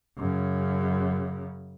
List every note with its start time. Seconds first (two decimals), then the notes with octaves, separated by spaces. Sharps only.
0.18 F#2 C#3